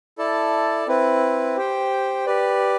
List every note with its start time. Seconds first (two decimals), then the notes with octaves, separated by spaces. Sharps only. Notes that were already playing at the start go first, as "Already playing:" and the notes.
0.18 E4 A4 D5 A5
0.87 C4 E4 B4
1.56 G4 C5 G5
2.26 G4 B4 D5